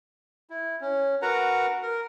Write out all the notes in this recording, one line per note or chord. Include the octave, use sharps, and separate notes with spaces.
E4
C#4
F#4 A#4 B4 F#5 A#5
A#4